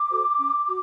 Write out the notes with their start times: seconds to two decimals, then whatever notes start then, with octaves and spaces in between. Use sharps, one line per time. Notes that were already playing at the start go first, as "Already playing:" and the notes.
Already playing: D6
0.10 F#4 A4 C5
0.39 C#4
0.68 F#4